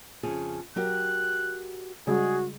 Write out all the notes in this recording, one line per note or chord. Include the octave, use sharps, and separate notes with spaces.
F2 C#3 G#4
F#3 F#4 G4 A#4 F#6
C#3 G3 G#3 F#4 G#4